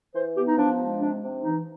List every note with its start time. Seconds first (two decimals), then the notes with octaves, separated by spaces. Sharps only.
0.14 E3 C5
0.36 B3 G4
0.47 D#4
0.57 F3 D4
0.78 G#3
1.00 C3 D4
1.21 C3
1.43 E3 D#4